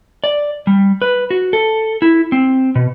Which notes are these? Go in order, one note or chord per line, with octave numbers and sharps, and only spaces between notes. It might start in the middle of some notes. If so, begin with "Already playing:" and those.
D5
G3
B4
F#4
A4
E4
C4
B2